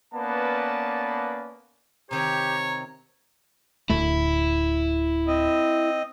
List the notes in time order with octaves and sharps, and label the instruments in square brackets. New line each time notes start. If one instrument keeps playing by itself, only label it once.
[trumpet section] A#3 B3 C#4 B4 D5 A5
[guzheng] C3 D#3 C4 [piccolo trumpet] G4 [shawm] C#5 [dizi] A#5
[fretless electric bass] D1 D2 A3 [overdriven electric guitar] E4
[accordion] C4 D#5